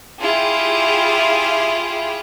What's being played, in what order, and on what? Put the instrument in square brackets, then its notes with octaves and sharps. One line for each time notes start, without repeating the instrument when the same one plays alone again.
[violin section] E4 F4 G4 G#4